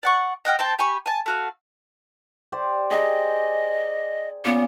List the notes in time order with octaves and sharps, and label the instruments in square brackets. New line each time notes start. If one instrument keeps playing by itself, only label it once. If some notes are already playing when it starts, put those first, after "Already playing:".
[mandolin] D5 F#5 C#6
D#5 F#5 G5 F6
C4 G5 A5
G4 G#5 B5 C#6
G#5 A5
A3 F#4 F5
[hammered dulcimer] G4 C5 D5
[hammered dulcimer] G#4 G5 A#5 [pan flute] D#5
[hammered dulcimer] A#2 C#3 D6 [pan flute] B3